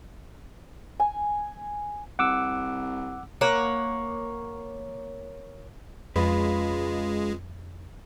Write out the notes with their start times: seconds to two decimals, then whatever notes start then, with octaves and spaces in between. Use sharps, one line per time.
1.00 G#5
2.19 C2 F#5 D6 E6
3.41 A#3 C#5 F#5
6.16 F2 C#3 G#3 F4 B4